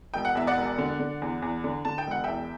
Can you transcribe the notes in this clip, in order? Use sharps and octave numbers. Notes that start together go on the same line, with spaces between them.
E1 G5
F#5
E2 E5
D5 F#5
E1
D3
D3
E2
E2
D3
D3 A5
G5
E1 F#5
E2 E5 G5